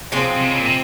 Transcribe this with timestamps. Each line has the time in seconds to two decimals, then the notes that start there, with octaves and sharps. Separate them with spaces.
0.12 C3 F3 G#3 C4
0.36 C3
0.47 C#3
0.57 A#2
0.65 C3